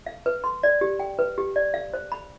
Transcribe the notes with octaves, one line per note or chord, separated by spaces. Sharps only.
F5
B4
C6
D5
G4
G5
B4
G4
D5
F5
C5
B5